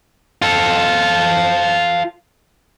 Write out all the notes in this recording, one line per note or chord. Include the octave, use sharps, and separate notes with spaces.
F4 A4